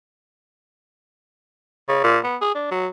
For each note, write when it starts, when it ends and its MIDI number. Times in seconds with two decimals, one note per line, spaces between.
1.89 2.01 49
2.04 2.18 46
2.24 2.36 59
2.41 2.52 68
2.55 2.67 62
2.71 2.87 54